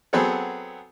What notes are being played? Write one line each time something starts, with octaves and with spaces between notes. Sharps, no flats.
F#3 B3 C4 G#4 A4